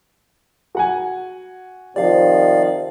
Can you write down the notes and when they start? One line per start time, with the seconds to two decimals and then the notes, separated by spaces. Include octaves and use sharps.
0.75 F#4 F#5 G#5
1.96 C3 D#3 F3 G4 D5 F5